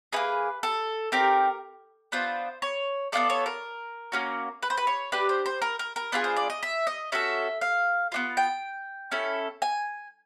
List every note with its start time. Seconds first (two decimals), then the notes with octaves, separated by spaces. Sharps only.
0.13 A#3 D#4 G#4 B4
0.63 A4
1.12 C4 D#4 G4 A#4
2.12 B3 D4 F4 C5
2.62 C#5
3.12 B3 D4 F4 A4 D5
3.30 C#5
3.46 A#4
4.12 A#3 C#4 F#4
4.63 B4
4.70 C5
4.77 B4
4.87 C#5
5.12 D4 G4 B4
5.29 C5
5.46 C5
5.62 A#4
5.79 A#4
5.96 A#4
6.12 B3 D4 F4 G#4
6.24 C5
6.37 D5
6.50 D#5
6.63 E5
6.87 D#5
7.12 C#4 F#4 A4 E5
7.61 F5
8.12 B3 D4 F4
8.37 G5
9.11 C#4 E4 A4
9.62 G#5